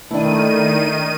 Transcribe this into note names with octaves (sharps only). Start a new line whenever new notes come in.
D#3 A3 D4 E4 D#7